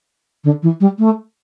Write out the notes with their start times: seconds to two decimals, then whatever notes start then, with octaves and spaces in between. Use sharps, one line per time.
0.44 D3
0.63 E3
0.80 G3
0.99 A3